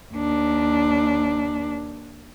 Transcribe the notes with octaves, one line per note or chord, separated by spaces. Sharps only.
D#2 D4